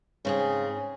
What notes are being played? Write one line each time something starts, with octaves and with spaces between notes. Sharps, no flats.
G#2 C#3 C4 G#4